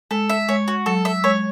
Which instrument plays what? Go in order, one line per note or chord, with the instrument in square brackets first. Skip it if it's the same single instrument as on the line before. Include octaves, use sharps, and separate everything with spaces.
[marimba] G#3 [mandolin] A4
[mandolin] E5
[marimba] G#3 [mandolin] C#5
[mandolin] F#4
[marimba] F#3 [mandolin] A4
[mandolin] E5
[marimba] G#3 [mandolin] C#5